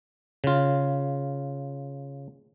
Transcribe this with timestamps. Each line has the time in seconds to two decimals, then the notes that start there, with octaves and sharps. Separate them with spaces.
0.44 C#3 F4